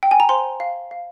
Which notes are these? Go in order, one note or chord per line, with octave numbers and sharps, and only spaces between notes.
G5
G#5
A#5
C5 C6
F5
F5